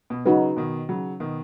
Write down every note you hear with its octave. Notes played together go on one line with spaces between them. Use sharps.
B2
C#3 F#3 D#4 F#4 B4
B2 D#3
C#3 F#3
B2 D#3